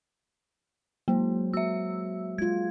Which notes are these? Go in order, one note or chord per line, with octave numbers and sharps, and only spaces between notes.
F#3 G#3 A#3 C5
A#3 F#4 E5 E6
G#3 F4 G#6